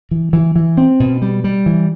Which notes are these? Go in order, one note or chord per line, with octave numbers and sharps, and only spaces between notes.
E3
E3
E3
C4
B2
G3
G3
E3